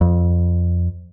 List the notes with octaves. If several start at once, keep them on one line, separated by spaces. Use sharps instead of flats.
F2